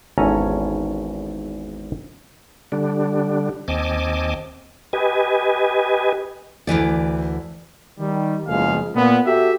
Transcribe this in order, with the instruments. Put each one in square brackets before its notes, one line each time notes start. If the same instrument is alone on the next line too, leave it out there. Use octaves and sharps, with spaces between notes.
[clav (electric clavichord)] G#1 E2 C#4 A4 G#5 A#5
[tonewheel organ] D3 G3 D4
D#2 C4 D#5 G#5 A5 D6
G4 B4 D#5 G#5
[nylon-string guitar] D2 C3 E3 D5
[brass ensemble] D#3 G3
F#1 E2 F3 G#3 G#4 F5
A#2 B3
F#4 G4 A4 E5